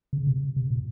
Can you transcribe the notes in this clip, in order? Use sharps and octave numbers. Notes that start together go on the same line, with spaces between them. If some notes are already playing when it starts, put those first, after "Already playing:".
C#3
C3
C3
A#2